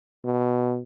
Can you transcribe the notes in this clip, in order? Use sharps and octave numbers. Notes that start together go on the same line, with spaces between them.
B2